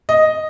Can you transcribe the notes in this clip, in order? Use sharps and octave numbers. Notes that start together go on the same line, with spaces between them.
D#5